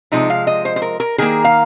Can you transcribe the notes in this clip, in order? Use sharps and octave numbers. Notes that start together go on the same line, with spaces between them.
C3 F3 G#3 D#4
F5
D#5
C5
C5
A#4
A#4
D#3 A#3 G#4
F5